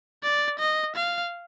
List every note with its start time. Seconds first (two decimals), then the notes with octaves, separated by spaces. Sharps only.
0.23 D5
0.59 D#5
0.96 F5